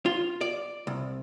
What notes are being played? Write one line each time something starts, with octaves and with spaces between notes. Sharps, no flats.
F4
D5
C2